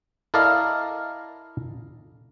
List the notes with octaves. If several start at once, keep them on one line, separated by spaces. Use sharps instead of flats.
E4 A4 A#4 D5 D#5 F5